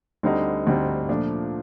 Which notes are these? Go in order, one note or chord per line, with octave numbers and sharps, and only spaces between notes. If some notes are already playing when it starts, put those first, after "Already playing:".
D2 D3 G3 C4 D#4
D2 D3 G3 C4 D#4
A#2 F3 A3 D4